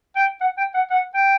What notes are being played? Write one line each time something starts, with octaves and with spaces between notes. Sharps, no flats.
G5
F#5
G5
F#5
F#5
G5